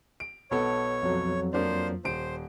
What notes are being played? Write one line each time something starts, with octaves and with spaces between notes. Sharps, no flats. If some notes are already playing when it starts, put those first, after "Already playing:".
D7
B1 B3 A4 C#5
F2 F#3
F3 A#3 D4 C5
D#1 C5 D7